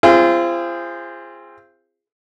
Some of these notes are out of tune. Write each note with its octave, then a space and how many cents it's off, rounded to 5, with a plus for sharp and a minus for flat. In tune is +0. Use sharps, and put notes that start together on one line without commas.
C4 +0 F4 -35 G#4 -20